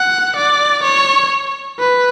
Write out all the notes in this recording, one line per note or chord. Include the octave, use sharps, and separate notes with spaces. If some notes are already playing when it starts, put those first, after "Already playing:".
Already playing: F#5
D5
C#5
B4